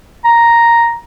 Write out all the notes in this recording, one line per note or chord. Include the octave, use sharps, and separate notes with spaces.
A#5